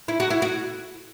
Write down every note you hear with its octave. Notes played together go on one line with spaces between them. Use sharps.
E4
F#4
E4
F#4